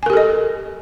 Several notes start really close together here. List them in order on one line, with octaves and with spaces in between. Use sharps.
G#5 A#4 G4 A4 D#5